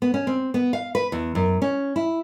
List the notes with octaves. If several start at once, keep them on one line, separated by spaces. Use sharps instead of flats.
B3
C#4
C4
B3
F5
B4
E2
F#2
C#4
E4